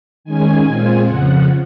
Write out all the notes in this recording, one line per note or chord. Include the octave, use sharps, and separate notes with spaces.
D#3 G#3 C#4 G#5
A#2 G#3 C4 F4
F2 C#3 F3 F#5